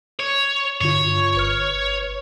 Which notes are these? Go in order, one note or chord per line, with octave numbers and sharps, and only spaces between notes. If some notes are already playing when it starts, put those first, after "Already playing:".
C#5
G2 D3 F4 C#5
G1 B4 F6